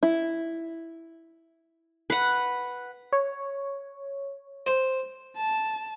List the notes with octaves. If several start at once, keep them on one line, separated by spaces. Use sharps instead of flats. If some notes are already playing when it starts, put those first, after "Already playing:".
E4
B4 F#5
C#5
C5
A5